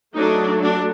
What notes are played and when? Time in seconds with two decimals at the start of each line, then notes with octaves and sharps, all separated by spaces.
0.14 F#3 A3 D4 D#4
0.62 D4